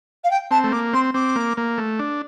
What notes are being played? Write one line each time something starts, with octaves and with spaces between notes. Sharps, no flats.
F5
G5
C4 A5
A3
A#3 D6
C4 C6
C4 D6
A#3
A#3
A3
D4